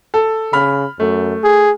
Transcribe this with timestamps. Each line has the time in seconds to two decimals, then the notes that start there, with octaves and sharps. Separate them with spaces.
0.14 A4
0.53 C#3 B5 F6
1.00 F#2 A3
1.43 G#4